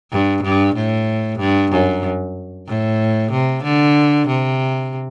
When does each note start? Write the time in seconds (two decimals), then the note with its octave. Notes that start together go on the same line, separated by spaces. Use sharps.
0.11 G2
0.44 G2
0.75 A2
1.39 G2
1.72 F#2
2.68 A2
3.32 C3
3.64 D3
4.28 C3